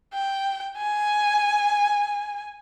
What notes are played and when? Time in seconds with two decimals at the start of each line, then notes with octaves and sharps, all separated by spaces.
0.14 G5
0.77 G#5